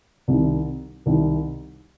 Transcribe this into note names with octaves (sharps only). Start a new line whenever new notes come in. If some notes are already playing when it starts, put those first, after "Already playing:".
C2 C3 D#3
C2 C3 D#3